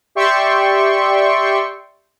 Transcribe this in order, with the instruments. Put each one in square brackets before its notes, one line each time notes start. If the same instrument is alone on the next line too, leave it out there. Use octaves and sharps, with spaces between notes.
[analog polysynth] G4 D5 E5 G5 C6 C#6